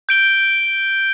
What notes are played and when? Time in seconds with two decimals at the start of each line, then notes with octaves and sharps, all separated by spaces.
0.09 G6 D7 G7